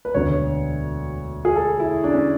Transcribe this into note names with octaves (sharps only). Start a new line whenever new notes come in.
B4
E1 D2 D3 C#5
G#4
A4
E4
D4
C#4